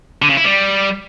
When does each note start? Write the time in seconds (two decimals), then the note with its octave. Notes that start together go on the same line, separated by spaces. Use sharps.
0.22 D3
0.29 C#3
0.37 E4
0.44 G3